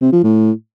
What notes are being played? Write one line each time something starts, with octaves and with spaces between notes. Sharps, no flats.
C3
F3
A2